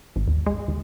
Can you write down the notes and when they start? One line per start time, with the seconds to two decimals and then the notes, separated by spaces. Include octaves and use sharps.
0.16 G#1
0.27 D#2
0.46 G#3
0.68 D#2